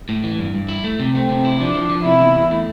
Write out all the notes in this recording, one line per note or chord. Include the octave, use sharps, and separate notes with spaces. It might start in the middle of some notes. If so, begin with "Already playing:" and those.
A2
E3
G2
G2
E4
A3
C3
A3 C4
C3
E4
F3 D4
F3
F3
C3 E4
E2
E2
A3